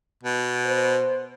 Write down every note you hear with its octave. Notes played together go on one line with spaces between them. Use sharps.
B2
C5